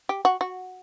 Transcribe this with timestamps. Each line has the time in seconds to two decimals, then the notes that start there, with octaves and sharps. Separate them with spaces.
0.09 G4
0.25 F#4
0.41 F#4